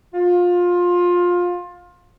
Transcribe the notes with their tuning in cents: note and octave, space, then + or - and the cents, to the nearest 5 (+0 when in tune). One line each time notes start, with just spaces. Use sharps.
F4 +20